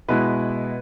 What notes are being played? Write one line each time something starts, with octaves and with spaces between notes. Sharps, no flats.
B2 G#3 B3 E4 B4